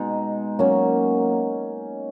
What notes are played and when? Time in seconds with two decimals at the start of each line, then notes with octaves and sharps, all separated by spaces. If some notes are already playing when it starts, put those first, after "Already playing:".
Already playing: B2 G#3 D#4
0.59 F#3 A#3 C#4